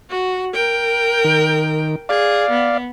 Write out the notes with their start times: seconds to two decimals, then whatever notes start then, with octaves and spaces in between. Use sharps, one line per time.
0.11 F#4
0.54 A#4 G5
1.24 D#3
2.09 G#4 D5 F5
2.51 B3